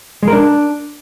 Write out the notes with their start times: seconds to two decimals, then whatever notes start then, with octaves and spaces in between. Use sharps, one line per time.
0.23 G#3
0.28 A#4
0.33 D4